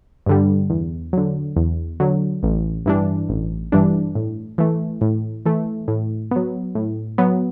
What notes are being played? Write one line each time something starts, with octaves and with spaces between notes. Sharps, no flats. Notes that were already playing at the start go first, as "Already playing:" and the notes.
G2 D3 G3
E2
D3 F#3
E2
D3 F#3
A1
G2 E3 G3 D4
A1
G2 E3 G3 D4
A2
E3 A3
A2
E3 A3
A2
F#3 B3
A2
F#3 B3